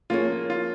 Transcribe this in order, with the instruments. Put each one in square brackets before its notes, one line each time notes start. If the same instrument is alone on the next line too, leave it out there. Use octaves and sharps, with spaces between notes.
[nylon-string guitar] F3 A#3 C#4 G#4 C#5 [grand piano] F4
[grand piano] F4